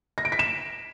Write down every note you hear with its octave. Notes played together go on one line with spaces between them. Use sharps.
A#6
D7
B6
E7